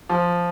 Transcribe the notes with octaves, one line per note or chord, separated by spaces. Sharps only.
F3